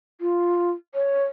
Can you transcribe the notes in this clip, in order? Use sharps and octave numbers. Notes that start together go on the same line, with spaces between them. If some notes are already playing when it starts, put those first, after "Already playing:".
F4
C#5